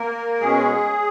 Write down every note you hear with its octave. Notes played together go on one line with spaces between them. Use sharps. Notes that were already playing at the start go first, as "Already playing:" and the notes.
Already playing: A#3 A#4
B2 G#3 C#4 G#4